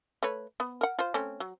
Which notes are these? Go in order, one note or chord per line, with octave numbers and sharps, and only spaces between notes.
A3 B4 C#5
B3
A#4 F#5
F4 C5
A3 C4 C#4
F#3